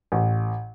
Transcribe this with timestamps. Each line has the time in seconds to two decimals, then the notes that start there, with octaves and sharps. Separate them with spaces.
0.12 A1